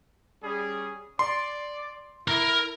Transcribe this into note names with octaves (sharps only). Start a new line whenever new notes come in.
G3 C#4 G#4
D5 C6
E4 A#4 A#5